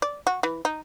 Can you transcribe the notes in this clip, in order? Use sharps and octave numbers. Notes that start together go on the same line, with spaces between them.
D5
F#4
E3
D#4